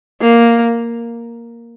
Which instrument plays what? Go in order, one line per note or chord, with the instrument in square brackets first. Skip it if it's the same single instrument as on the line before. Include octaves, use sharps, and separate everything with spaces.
[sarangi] A#3